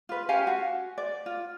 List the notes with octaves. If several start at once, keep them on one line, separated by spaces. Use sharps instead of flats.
F4 B4
C#4 G4 F5 G#5
F#4
D5
F4